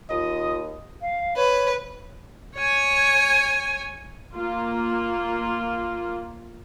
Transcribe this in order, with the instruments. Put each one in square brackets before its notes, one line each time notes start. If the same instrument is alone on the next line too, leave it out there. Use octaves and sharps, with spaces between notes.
[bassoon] D#2 [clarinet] F4 [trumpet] D#5 [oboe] D#6
[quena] F5
[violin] B4 [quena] C#5
[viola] C#5 G#5
[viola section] A#3 F4